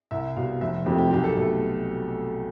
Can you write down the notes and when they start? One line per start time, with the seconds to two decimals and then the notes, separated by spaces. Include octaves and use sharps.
0.11 C2 E5
0.36 B2 G3 F5
0.61 F1 E5
0.86 F2 C3 F3 A3 G4
0.98 G4
1.11 B1 G4
1.24 A4
1.37 B2 A3 A4